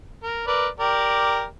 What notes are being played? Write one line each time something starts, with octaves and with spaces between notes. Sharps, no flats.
A#4
A#4 B4 D5
G4 A#4 D5